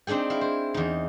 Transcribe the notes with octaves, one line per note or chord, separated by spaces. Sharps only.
C4 D4 D#4 G#4 G5
E4 F5
C5
E2 D#4